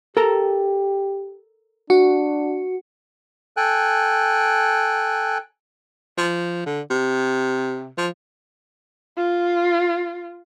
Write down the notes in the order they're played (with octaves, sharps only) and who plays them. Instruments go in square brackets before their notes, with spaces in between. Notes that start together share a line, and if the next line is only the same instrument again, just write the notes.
[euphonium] G4 [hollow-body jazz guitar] A4 A#4 A#5
[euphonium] D4 [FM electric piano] F#4
[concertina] A4 G5 G#5 F#6
[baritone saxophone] F3
D3
C3
F3
[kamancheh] F4